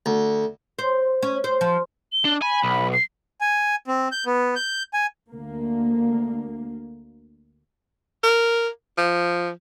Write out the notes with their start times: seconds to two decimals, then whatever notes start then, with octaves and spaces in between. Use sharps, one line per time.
0.06 D2
0.79 C5
1.23 C#4
1.44 C5
1.61 F3
2.12 G7
2.25 D4
2.42 G#5 B5
2.64 B1
2.93 C7
3.41 G#5
3.88 C4
4.12 G6
4.26 B3
4.56 G6
4.93 G#5
5.30 D2 A#3
8.23 A#4
8.98 F3